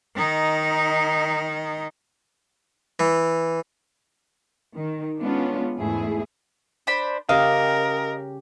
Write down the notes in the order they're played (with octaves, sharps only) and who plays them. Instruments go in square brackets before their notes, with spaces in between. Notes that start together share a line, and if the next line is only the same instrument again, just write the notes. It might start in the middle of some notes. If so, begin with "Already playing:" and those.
[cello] D#3 D#4
[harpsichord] E3
[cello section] D#3
G#3 B3 C#4 D4 F4
E2 G#2 A3 E4 G#4
[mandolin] D4 C5 B5
[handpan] C#3 C#4 G4 [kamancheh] A#4 [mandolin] D#5 [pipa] F5